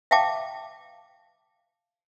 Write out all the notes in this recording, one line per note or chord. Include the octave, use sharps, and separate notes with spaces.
E5 F5 G5 A5 D6